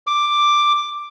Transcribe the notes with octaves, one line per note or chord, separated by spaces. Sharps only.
D6